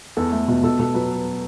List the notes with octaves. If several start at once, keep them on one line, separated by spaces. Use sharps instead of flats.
E2 A4
A3
B2
B2 A4
B2 A4
F#3 B4